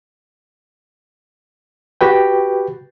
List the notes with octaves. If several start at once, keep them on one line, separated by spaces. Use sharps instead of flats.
F#4 G4 B4 G5